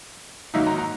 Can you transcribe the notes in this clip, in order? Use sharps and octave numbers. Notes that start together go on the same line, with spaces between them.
G#2 D#3 F#3 A#3 D#4 E5
A#5
A#5